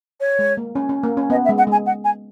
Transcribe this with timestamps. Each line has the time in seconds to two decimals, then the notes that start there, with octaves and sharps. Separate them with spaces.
0.20 C#5
0.39 G#3
0.57 A#3
0.75 C#4
0.89 C#4
1.03 A#3
1.17 C#4
1.30 B3 D#5
1.44 E5
1.49 G#3
1.58 F#5
1.67 G#3 G#5
1.86 F#5
2.04 G#5